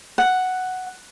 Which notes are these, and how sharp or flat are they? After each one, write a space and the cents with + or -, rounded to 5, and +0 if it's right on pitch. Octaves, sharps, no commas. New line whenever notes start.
F#5 +0